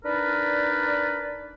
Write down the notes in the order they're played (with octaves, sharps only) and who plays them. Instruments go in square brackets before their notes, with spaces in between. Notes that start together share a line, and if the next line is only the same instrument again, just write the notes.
[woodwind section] D4 D#4 A#4 B4 D5